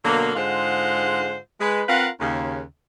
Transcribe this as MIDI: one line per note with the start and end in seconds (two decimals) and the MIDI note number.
0.04 0.33 47
0.04 0.33 50
0.04 0.33 54
0.04 0.33 58
0.35 1.37 44
0.35 1.37 50
0.35 1.37 56
0.35 1.37 65
0.35 1.37 72
0.35 1.37 78
1.60 1.82 56
1.60 1.82 71
1.87 2.08 60
1.87 2.08 65
1.87 2.08 70
1.87 2.08 71
1.87 2.08 77
1.87 2.08 78
2.20 2.61 39
2.20 2.61 49